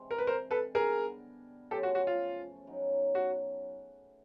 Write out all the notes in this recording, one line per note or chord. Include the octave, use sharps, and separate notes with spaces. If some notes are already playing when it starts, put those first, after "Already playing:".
Already playing: C3 E3 G#3 C4 D4
A#4
B4
A#4 C5
A4 B4
D3 G3 B3 D4 G#4 A#4
F#2 C#3 F3 A3 G4 A4
F#4
F#4
F4
C#3 F#3 B3 D#4
F#4